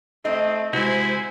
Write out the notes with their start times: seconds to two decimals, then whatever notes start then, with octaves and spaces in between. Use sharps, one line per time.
0.25 A3 C4 D#4 D#5
0.73 C3 G#3 E4 F#4 C5 G#5